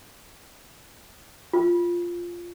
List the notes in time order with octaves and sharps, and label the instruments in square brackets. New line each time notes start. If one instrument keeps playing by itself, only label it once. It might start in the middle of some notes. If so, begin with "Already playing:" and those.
[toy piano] F4